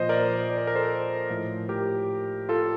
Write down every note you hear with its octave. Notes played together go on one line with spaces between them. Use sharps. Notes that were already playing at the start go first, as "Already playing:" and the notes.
Already playing: A#2 F3 C5 D#5
A#4 D5
D5
C5
A#4
A4 C5
A2 F3
G4 A#4
F4 A4